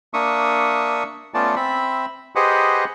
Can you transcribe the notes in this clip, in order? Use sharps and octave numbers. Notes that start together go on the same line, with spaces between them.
A#3 D4 E5 C#6 D#6
A3 B3 C#4 F4 D5 A5
C4 E5 B5
G4 G#4 B4 C5 D#5 F#5